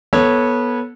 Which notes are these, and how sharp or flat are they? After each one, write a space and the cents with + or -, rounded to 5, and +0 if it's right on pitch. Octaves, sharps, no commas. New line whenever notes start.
B3 -20 A4 +0 C#5 -15